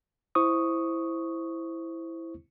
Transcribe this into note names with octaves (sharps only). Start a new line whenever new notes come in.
E4 C5 C#6 D#6